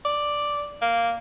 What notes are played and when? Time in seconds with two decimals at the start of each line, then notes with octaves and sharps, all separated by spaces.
0.05 D5
0.82 A#3